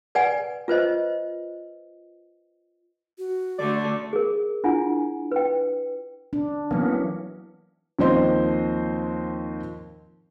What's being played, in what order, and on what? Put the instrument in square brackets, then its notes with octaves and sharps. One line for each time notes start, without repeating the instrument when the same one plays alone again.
[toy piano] B4 D5 F#5 G#5
F4 B4 C5 D#5
[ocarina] F#4
[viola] D3 A3 [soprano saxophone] D5
[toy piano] G#4 A#4
D4 E4 F4 F#5 G#5
B4 G5
[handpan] D4
[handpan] E3 F#3 [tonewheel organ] A#3 B3 C#4
[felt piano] D#2 F3 C4 C5 D#5 C6